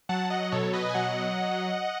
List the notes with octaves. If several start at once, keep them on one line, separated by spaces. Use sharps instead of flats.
F#3 F#5 A5
D#5 F#5
B2 A4 C#5
B4 D#5
G#5
F#3 D#5 F#5